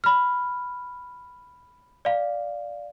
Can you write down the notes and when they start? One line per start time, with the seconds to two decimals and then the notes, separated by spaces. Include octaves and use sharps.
0.04 B5 F6
2.05 D5 F5